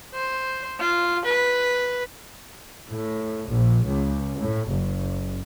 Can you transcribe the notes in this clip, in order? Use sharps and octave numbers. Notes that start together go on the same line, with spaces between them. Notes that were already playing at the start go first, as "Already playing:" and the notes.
C5
F4
B4
A2
A#1
C#2
A2
F#1